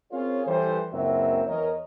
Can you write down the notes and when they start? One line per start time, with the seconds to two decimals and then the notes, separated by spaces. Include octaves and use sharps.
0.11 C4 C#4 F4 G#4 A#4 C#5
0.46 E3 G3 A4 C5
0.93 F#1 C#2 F#3 C4 A#4 E5
1.47 E2 A#4 C#5 D#5